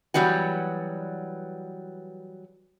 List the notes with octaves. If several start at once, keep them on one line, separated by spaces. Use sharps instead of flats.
E3 F#3 G3 B3 F#4